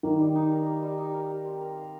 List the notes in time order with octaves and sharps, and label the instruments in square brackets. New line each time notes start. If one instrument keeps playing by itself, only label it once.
[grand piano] D#3 [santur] A#3
[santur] G3
D#4
A#4
A#3
G3
D#4
A#4
G4
C4
A#4
F5